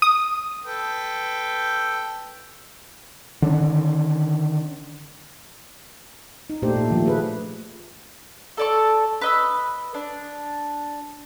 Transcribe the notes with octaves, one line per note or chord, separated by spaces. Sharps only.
D#6
A4 B4 G5
D3 D#3 C#4
D#4
A#2 A3 D4 G4 C5
A#2
D#3 F3 A3
A#3 G#4 B4
A4 D5 C#6
B4 D#5 E6
D4